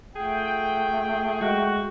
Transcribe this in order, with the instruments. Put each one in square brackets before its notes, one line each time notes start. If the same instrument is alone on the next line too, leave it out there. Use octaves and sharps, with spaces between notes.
[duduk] A3 [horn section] F4 F#5 G5 [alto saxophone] G#4
[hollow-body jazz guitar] G#3 [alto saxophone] F#4